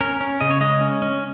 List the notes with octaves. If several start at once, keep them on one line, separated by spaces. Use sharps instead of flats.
C#4 A#4
C#4
C#3 D#5
C#5
G#3 D#5
C#4
C#4